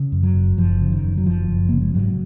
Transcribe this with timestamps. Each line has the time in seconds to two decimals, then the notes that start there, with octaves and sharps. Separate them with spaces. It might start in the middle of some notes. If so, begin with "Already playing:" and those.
Already playing: C#3
0.12 F#2
0.23 F#3
0.35 F#1
0.57 F#1 F3
0.81 C#3
0.92 D#3
1.04 F#2
1.18 F#3
1.26 F#1 F3
1.50 F#1
1.69 C#3 A#3
1.82 G#3
1.95 G#2 F#3